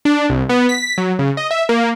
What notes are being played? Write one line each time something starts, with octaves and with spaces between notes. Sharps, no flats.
D4
C2
B3
B6
F#3
C#3
D#5
E5
A#3